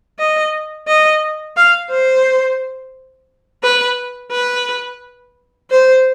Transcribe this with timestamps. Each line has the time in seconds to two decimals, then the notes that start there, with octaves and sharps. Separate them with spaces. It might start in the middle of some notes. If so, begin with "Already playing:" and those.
0.19 D#5
0.88 D#5
1.57 F5
1.91 C5
3.63 B4
4.32 B4
5.71 C5